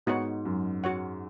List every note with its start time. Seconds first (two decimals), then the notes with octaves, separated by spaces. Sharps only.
0.06 G#2 B3 D#4 F#4 C#5 F#5
0.45 F#2
0.84 F#4 C#5 F#5